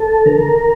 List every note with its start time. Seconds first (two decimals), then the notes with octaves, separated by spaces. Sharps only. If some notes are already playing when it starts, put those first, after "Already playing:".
Already playing: A4 A5
0.26 D3 A#4 A#5